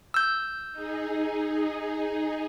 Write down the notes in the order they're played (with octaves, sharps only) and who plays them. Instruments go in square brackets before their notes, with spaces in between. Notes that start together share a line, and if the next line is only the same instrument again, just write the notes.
[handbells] E6 G6
[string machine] D#4 G#4